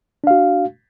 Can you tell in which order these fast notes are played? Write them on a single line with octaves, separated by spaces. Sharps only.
D4 F5 F#4